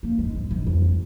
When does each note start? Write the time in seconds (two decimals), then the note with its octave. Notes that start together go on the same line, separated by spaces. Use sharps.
0.03 A#3
0.18 G#3
0.35 G#2
0.51 G#2
0.67 F2